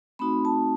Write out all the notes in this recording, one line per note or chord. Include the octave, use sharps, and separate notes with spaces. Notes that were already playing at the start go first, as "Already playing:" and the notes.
A3 C4 D#4 F#4 B5
A5